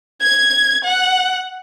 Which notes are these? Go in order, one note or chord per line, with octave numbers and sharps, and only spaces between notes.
G#6
F#5